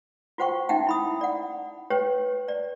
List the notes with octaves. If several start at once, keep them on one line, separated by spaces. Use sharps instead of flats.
F4 F#4 C5 F#5 G5 C#6
C#4 D#4 E5 F#5 G5
E4 B5 D#6
D5 F#5
G4 B4 C#5 G5
D5